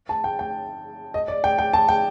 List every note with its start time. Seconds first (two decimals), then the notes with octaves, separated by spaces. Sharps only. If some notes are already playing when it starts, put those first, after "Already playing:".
0.09 A5
0.24 G5
0.39 G5
1.14 D#5
1.28 D5
1.44 G5
1.58 G5
1.73 A5
1.89 G5